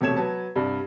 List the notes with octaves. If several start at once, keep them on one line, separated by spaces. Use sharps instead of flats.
E1 C3 A3 C#5 G#6 E7
F#3 B4 A5
C2 G2